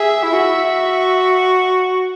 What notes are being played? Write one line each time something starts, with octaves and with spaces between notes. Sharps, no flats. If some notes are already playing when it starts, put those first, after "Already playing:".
Already playing: G#4 E5
E4
F#4